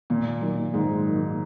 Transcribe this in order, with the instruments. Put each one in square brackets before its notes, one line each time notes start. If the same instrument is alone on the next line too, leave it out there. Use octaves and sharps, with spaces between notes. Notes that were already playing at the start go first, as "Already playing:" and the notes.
[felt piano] A#2 [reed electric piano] D#3
[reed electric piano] F#3 A#3 D#4
[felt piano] G#2 [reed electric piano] D#3
[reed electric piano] F#3 A#3 D#4